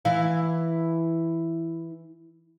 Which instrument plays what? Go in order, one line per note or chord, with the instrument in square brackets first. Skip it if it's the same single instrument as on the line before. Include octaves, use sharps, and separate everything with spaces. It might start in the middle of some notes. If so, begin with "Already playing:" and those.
[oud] E3 E4 F5